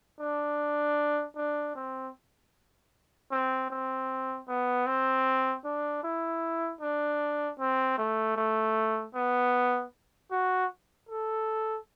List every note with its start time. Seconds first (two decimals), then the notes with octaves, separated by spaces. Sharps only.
0.20 D4
1.36 D4
1.75 C4
3.31 C4
3.70 C4
4.48 B3
4.86 C4
5.64 D4
6.03 E4
6.81 D4
7.59 C4
7.98 A3
8.36 A3
9.14 B3
10.31 F#4
11.09 A4